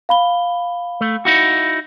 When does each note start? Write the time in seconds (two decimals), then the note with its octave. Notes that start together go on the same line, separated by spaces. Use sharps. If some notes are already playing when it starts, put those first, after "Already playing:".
0.09 F5 B5 G7
1.01 A3
1.25 D#4 E4 F#4